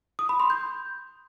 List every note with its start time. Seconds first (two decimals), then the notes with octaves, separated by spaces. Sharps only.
0.19 D#6
0.29 B5
0.40 C6
0.50 G6